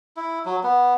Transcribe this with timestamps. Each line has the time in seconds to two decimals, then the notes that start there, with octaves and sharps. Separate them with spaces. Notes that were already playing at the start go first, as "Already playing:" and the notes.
0.16 E4
0.45 F#3
0.63 B3